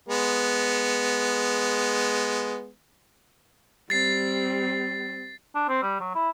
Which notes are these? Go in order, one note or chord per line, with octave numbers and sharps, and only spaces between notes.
G#3 B3
G3 C4 A6 C7
D4
C4
G3
F#3
E4